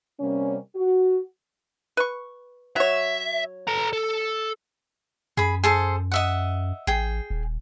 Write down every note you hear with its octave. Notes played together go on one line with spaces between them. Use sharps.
C3 G3 A#3 C#4
F#4
B4 C#6
F#3 C#5 E5
A4 A#5
A4
F#2 G#4 B5
G#4 A4 C5
D#5 E5 F#5
A1 G#4 G5
D#1